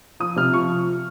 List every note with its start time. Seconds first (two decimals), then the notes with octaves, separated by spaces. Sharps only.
0.20 F3 D#6
0.36 C3 F6
0.54 F3 C#6